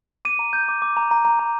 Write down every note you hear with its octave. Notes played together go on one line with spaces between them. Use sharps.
D6 D#7
A#5
G6
D6
D6
A#5
A#5
A#5
A#5